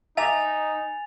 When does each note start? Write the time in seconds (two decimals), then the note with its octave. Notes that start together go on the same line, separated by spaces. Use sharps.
0.17 D#4 E5 G#5 A#5 D6 A6 F7